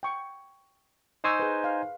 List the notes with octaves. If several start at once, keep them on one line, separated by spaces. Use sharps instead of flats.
G5 C#6
D#4 C5 G#5 A#5 C#6 E6
G#4 B4
F5